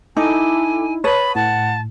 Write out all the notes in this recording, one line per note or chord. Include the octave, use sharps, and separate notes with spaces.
D#4 E4 A4 G#5 D6
B4 C#5 A5 B5 D#6
A2 F#5 A5